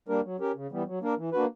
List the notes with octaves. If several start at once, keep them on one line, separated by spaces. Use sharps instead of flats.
G3 A#3 D4 A#4
F#3
C#4 G4 A#4
C#3
E3 G3 B3
F#3
A#3 D4 A#4
E3
A#3 D4 F#4 B4